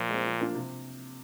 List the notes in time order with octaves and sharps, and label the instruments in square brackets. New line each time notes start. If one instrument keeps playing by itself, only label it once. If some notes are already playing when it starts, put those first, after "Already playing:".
Already playing: [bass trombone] A#2 [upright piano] F3
[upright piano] G#3 C4
F3
A#3 D4 F4
C3